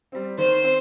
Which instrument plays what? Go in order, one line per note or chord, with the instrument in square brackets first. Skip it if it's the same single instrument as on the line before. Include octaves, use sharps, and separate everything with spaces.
[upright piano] G3 C4
[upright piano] D#3 [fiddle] C5
[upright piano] C4